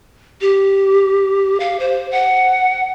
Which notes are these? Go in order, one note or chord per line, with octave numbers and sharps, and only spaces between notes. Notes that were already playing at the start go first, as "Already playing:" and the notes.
G4
F5
C5
F#5